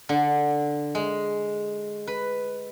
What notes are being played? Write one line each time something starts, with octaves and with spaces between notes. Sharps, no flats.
D3
G#3
B4